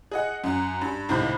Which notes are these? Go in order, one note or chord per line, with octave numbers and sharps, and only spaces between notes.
G#4 D#5 F#5
F#2 F#5
G2
C#2 A2 C3 D#3 B5 G6